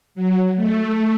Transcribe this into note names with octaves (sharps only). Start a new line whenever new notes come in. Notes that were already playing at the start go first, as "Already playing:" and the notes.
F#3
A3